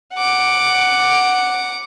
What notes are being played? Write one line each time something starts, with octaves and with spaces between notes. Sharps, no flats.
F#5 D6